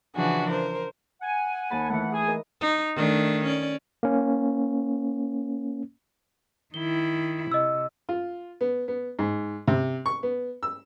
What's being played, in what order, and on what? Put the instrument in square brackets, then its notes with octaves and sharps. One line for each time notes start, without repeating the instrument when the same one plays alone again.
[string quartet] C#3 E3 F3 D4 F#4 G#4
A#4 C5
[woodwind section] F#5 G#5
[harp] D#2 A5 B5
[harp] E3 A3 [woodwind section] F#5
[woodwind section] G#4 G#5
[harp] A#4 D#5
[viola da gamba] D#4
D#3 A3 D4
C#4 D5
[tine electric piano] A#3 C#4
[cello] D#3 E4 [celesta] G7
[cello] C3 [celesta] D#5 E6
[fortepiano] F4
B3
B3
G#2
C3
C#6
B3
E6